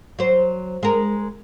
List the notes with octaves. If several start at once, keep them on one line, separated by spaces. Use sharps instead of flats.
F#3 C5
G#3 A#4